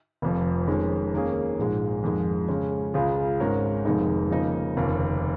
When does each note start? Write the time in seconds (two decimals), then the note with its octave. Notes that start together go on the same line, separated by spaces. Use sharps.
0.22 F1 F2 F3
0.67 F2 D#3 G#3 C#4
1.13 D#2 D#3 A#3 C#4 G#4
1.59 A#1 G#2 G#3
2.04 F2 D#3 G#3
2.49 C#3 G#3 C#4
2.94 C#2 C#3 G#3 F4 G#4
3.40 G#1 G#2 G#3 C#4 A#4
3.85 F1 F2 D#3 G#3 D#4
4.31 C#3 F3 A#3 D#4
4.77 F1 D#2 C#3